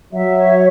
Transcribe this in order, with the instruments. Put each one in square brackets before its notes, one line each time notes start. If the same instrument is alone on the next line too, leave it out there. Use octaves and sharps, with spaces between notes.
[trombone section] F#3 [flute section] E5
[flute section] C#5